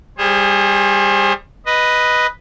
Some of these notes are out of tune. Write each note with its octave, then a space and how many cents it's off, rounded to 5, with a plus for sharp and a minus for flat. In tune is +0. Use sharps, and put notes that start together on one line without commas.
G3 +25 G#4 +0 C5 +35
B4 +0 D#5 +0